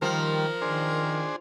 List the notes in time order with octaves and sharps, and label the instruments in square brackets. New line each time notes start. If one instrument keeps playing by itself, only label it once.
[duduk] D#3 [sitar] F3 [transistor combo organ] G3 [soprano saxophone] A#4
[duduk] D#3 [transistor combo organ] D4 G#4 C5